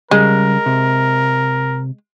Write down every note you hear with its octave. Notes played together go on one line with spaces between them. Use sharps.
C#3 G3 G#3 A#4
C3